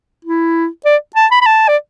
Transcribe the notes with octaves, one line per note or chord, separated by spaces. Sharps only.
E4
D5
A5
B5
B5
A5
D5